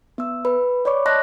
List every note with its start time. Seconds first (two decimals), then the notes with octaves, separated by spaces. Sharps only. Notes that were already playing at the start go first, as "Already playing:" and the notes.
0.18 B3 E6
0.45 B4 B5
0.85 C#5 D5 B5 C#6 D6
1.06 D#5 A5 C6 C#6 F#6 A#6